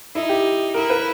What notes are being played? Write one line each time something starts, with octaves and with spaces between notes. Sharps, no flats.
D#4 E4
G4
E4 A#4
B4